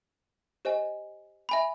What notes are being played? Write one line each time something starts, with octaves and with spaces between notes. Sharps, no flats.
G4 C5 D#5 G#5
E5 G#5 B5